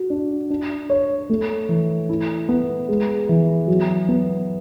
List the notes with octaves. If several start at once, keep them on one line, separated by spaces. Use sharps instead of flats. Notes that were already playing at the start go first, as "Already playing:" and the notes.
Already playing: F#4
D4
D4
C#5
A3
E3
E4
B3
G#3
E3
F#3
B3